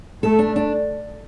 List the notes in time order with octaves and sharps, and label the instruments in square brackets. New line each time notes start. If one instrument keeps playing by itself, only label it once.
[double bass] A3 [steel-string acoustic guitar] A4
[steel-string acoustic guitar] D4
D4